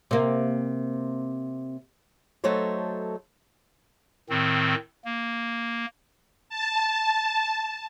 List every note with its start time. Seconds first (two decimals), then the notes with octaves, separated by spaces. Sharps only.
0.11 C3 A#3
2.44 F#3 A3 D#4 A4 C5 C#5
4.30 A2 D#3 C4
5.05 A#3
6.49 A5